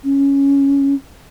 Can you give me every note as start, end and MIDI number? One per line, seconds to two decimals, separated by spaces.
0.04 0.94 61